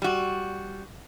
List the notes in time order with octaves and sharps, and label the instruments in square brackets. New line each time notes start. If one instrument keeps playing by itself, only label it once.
[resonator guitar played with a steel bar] G3 F#4